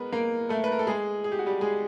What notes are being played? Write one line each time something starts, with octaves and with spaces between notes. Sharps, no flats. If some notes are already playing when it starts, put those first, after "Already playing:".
Already playing: G#3 B3 A#4 B4
A#3 A#4
A3 A4
B4
A#4
A4
G#3 G#4
G#4
G4
F#4
G3 G4
G#3 G#4